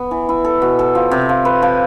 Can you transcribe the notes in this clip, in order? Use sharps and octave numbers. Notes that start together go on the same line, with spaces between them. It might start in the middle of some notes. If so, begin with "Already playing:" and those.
Already playing: B3
E3
E4
A4
B2
A4
F3
C3
F3
B4
F3